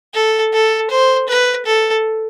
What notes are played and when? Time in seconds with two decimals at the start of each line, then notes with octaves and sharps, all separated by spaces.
0.14 A4
0.53 A4
0.90 C5
1.28 B4
1.66 A4